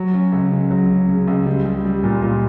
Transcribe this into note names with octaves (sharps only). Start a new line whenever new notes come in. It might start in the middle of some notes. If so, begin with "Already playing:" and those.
Already playing: F#3
C#4
C#2
C#3
F#3
C#3
C#3
C#2
G3
G3
G3
A#2
A#2